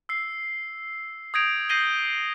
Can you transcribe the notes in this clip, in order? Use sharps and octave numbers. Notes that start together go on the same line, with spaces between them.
E6 C7
D#6 G6 G#6 A#6 D7 F7
G6 A#6 C7 D#7 F#7 G7